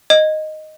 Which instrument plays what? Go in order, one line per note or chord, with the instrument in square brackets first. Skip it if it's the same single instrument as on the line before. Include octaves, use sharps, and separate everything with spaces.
[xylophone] D#5